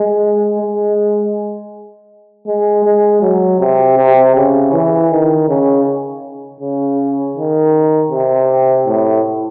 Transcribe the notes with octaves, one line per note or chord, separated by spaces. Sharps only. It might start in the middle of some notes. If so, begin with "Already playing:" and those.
Already playing: G#3
G#3
G#3
G#3
F#3
C3
C3
C#3
E3
D#3
C#3
C#3
D#3
C3
A2